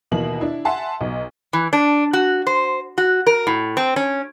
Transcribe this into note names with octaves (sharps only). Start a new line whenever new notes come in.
D#2 B2 E3 A#3 F#7
D4 E4
E5 F#5 G#5 A5 C6
B1
E3
D4
F#4
C5
F#4
A#4
A2
C4
C#4